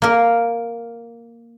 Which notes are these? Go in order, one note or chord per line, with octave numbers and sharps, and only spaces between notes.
A#3 A#4